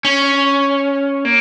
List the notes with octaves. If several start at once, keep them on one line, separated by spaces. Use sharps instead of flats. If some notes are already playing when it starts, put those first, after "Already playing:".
C#4
A#3